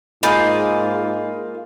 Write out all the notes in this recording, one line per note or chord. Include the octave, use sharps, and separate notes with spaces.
G#2 A#3 F4 G#4 D#5 B5 G6